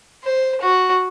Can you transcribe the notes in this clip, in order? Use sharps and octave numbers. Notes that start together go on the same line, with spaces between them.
C5
F#4